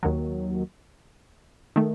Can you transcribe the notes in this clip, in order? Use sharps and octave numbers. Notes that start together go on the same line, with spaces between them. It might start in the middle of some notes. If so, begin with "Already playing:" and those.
D#2 D#3 F#3
D#3 A3